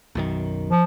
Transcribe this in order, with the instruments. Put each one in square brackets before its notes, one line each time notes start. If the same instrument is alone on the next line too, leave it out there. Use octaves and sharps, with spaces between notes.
[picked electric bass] B1 F#2 D#3
[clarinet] F3